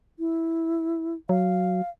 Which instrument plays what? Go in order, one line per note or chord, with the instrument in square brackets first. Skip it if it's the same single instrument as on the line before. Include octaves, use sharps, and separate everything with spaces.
[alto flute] E4
[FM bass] F#3 [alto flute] F5